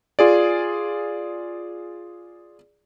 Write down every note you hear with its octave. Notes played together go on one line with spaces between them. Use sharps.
F4 G#4 D5